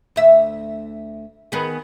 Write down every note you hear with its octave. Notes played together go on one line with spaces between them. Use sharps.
D2 E5
D#3 B3 G#4